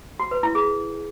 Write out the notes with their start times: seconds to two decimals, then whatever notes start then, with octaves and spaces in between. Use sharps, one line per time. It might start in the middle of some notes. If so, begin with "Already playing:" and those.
0.20 F#4
0.31 B4
0.43 E4
0.55 G#4